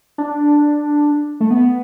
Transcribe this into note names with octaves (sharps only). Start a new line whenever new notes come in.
D4
A3
B3